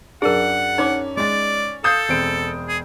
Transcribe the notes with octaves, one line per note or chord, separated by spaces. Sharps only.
F#2 D4 G#4 A#4 F#5
C#4 D#4 D6
G#3 D5 A6
A4 F5 D#6 G6 C7 E7
E1 C4 D7
G#4